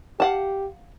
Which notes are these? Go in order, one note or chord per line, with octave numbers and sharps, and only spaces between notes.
G4 F5 F#5 A5